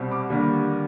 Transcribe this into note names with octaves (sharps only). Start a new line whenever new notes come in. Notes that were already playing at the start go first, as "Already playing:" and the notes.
Already playing: C2 B2 G3 C4
D6
D#2 D3 G3 A#3